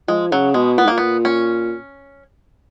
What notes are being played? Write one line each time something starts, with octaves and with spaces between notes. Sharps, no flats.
F3 G#3
C#3 F#3
B2 G#3
A#2 B3
G#2 A#3
A#2
B3
C#4